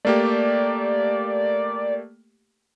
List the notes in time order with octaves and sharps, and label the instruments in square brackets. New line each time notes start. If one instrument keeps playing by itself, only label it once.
[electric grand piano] A3 A#3 G4 [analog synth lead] D5